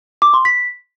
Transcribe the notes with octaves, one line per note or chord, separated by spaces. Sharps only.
D6
C6
B6